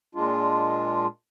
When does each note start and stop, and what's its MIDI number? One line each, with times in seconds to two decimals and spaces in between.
0.15 1.06 46
0.15 1.06 56
0.15 1.06 62
0.15 1.06 65